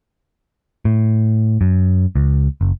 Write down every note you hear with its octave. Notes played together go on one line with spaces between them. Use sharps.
A2
F#2
C#2
F#1